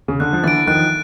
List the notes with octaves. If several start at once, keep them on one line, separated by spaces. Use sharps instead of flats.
C#3
D3 F#6
F3
D3 E3 A6 D7
D#3 F3 F#6